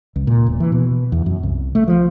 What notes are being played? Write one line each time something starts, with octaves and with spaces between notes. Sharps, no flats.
C#2
A#2
E1
E3
B2
E2
F#2
C2
A3
F3